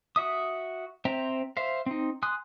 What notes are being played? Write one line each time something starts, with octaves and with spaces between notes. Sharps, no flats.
F#4 E5 D#6
C4 C5 E5 G5 A#5
C5 E5 F5
C4 D#4
G#5 C6 D#6 F#6